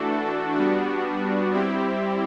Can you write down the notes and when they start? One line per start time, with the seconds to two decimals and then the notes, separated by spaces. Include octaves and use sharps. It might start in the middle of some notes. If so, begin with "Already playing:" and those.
Already playing: E3 A3 D4 F#4 A4
0.56 G3 B3 D4 F#4
1.52 G3 C4 E4 G4